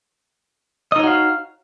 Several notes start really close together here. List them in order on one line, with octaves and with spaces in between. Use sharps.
D#5 D#4 C#5 F#4 F5